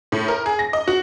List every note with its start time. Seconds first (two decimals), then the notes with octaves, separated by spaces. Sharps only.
0.12 A2
0.28 A#4
0.46 G#4
0.59 A#6
0.73 D#5
0.88 F#4